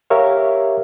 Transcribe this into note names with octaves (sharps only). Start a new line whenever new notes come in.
G4 A#4 C#5 E5 F5